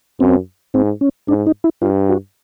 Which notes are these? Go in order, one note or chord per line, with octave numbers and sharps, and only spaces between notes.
F#2 C4
G#2 C4
C#4
G#2 D4
D#4
E4
G2 F4
F#4